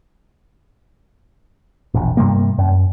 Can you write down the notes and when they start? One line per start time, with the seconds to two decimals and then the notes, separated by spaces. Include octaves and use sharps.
1.94 E1 A#1
2.17 G2 C3 G3 A#3
2.58 F#2